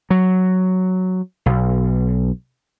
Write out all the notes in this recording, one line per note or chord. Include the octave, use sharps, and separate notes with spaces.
F#3
B1